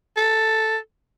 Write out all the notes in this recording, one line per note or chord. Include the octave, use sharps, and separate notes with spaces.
A4